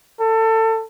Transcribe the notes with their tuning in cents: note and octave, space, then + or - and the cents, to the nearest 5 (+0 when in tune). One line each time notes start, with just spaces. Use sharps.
A4 +25